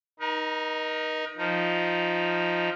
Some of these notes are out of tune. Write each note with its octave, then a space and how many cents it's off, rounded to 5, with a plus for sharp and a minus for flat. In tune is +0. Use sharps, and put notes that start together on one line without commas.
D#4 +0 A#4 +40
F3 +0 D#4 +0